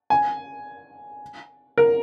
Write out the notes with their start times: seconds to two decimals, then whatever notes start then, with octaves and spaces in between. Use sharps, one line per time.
0.10 G#5
1.78 A#4